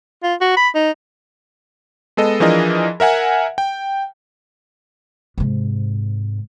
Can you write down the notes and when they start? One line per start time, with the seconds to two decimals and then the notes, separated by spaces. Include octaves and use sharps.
0.23 F4
0.41 F#4
0.57 B5
0.75 D#4
2.17 G#3 B3 A4 D#5
2.40 E3 F3 D4 G#4 A#4 D#5
3.00 A#4 E5 F#5 G#5
3.58 G5
5.38 G#2 C3